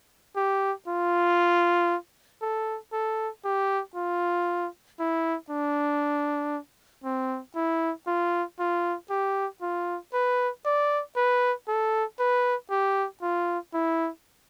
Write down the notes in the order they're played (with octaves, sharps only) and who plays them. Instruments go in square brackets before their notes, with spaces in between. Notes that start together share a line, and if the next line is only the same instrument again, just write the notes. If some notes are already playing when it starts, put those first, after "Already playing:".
[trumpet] G4
F4
A4
A4
G4
F4
E4
D4
C4
E4
F4
F4
G4
F4
B4
D5
B4
A4
B4
G4
F4
E4